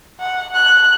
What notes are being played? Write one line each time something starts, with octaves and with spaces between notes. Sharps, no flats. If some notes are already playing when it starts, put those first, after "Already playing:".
F#5
F#6